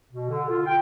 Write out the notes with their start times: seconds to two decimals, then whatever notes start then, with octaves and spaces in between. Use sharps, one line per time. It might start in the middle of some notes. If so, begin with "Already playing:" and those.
0.12 B2
0.30 D3
0.50 F4
0.66 G5